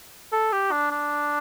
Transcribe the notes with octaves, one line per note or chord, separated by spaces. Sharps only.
A4
G4
D4
D4